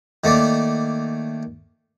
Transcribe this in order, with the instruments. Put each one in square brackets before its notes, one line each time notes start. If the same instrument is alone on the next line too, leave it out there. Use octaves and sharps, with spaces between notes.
[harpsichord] D#3 A3 A#3 D5